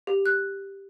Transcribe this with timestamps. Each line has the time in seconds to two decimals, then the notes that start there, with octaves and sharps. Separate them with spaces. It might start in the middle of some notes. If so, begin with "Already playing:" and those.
0.07 G4
0.26 F#6